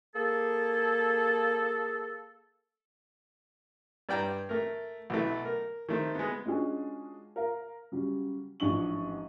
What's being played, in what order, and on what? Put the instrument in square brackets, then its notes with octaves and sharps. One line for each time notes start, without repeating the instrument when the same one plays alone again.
[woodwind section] A#3 G#4 A4
[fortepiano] G2 D5 G5 A#5
A3 A#4
B1 E3 A3
A#4
D#3 A3 C5
G#3 B3
[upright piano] G#3 C#4 D4 F4 F#4 G#4
A#4 F5
C#3 F#3 G3
A1 G#2 F3 D4 C#6 F#7